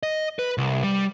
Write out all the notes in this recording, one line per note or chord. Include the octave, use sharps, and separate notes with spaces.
D#5
B4
C2
G3